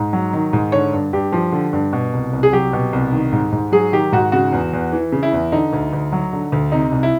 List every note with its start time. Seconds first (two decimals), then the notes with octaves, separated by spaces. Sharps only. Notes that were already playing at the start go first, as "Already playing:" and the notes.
Already playing: G#2
0.13 F#3
0.33 D#3
0.53 G#2
0.72 D3 C#5
0.93 G2
1.13 G2 G4
1.32 F3
1.52 D3
1.73 G2
1.93 B2
2.13 C2
2.33 C2
2.43 G#4
2.53 F#3 G4
2.73 B2
2.93 C2
3.12 D#3
3.32 G#2
3.52 G#2
3.72 F#3 G#4
3.92 D#3 G4
4.12 G#2 F#4
4.32 C#3 F#4
4.52 E2
4.73 E2
4.93 E3
5.12 C#3
5.23 E4
5.33 E2
5.52 D3 D#4
5.73 D2
5.93 D2
6.12 F#3
6.33 D3
6.52 D2
6.72 C3 D#4
6.92 C2
7.03 E4